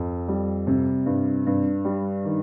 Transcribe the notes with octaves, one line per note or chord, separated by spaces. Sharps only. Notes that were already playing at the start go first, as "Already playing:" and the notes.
Already playing: F2
G3
C3
G2
G2
G3
D#3